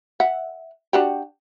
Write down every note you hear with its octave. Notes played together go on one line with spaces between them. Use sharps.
E5 F#5
D4 F#4 G4